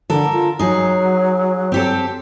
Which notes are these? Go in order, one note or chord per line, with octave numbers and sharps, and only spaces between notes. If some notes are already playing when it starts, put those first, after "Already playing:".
D3 A4 A#4
F4
F#3 D#4 G#4
C4 G4 A4